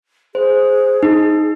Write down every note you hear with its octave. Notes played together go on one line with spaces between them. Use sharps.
G#4 C5
D#4